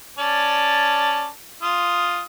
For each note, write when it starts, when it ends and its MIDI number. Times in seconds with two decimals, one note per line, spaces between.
0.19 1.28 61
0.19 1.28 74
0.19 1.28 81
1.63 2.21 65
1.63 2.21 87